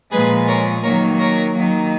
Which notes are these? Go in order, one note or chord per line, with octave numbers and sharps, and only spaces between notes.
A#2 F3 G#3 G#4 B4
A#4 C#5
D#3 F#3 A#3 A#4 C#5
A#4 C#5
D#3 F#3 A#3